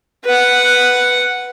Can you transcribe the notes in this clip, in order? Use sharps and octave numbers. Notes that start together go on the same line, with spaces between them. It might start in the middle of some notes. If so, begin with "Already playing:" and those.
B4 F#5